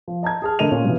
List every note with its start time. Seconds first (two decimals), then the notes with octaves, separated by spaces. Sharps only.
0.08 F3
0.23 D#5 A5 A#5 G#6
0.42 G#4 A5 F6
0.59 D3 A3 A#4 D#5 D#7 F7
0.71 A#2 C#4
0.85 G2 B2 E3